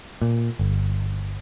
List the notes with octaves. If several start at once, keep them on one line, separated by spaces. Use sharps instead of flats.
A#2
G1